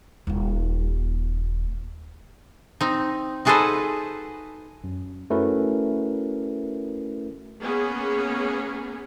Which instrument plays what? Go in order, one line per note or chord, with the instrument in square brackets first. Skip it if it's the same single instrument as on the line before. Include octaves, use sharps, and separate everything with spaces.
[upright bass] D#1 F4
[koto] C4 D#4
D#4 F#4 G#4 A4 B4 C5
[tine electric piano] F#2
A3 C#4 E4 F#4 A#4 B4
[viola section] A#3 B3 C#4 G#4